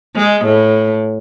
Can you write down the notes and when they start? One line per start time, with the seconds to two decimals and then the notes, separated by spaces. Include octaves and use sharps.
0.16 G#3
0.45 A2